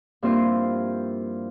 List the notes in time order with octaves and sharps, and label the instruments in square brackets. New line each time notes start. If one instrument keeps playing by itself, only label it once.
[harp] G2 F3 A#3 C4 E4 F4